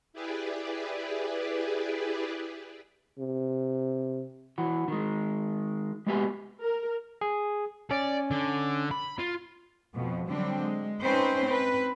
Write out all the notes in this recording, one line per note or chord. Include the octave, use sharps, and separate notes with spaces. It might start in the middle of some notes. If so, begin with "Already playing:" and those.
E4 G4 G#4 B4 D5
C3
E3 F#4
D#3 G#3
G#3 A#3 B3 G4 D#5 G#5
A#4
G#4
C#4 D5
D3
B5
F4
F2 B2
D3 F#3 G3 C4 D4
G#3
C4 C#4 D#4 B4 C5
C4 B4